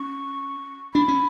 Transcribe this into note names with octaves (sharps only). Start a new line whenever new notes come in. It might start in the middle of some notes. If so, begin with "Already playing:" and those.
Already playing: C#4 C#6
D4 B5
C#4